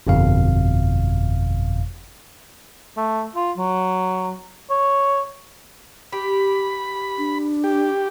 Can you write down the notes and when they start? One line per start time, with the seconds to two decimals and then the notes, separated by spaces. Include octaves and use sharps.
0.07 G1 F2 B2 F5
2.97 A3
3.36 F4
3.57 F#3
4.70 C#5
6.13 G4 B5
7.18 D4
7.64 G4